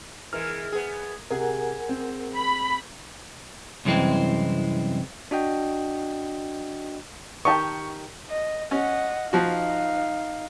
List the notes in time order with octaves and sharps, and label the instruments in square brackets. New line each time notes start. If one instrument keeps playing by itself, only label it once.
[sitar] E3 G#3 [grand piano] A#4 [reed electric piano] F6
[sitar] B3 G#4
[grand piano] C3 [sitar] G#4 [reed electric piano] A#4 F#5 G#5
[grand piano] C4
[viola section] B5
[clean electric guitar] C2 F#2 E3 G#3 C4
[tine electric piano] D4 F#4 D#5 G5
[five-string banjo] D#3 G4 A5 [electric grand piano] C#6
[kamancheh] D#5
[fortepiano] C#4 [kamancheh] D#5 F#5
[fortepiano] F3 F#4 [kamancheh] D#4 F5